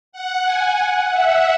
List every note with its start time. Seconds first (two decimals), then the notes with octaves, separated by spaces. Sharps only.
0.12 F#5
0.45 G#5
0.78 F#5
1.11 E5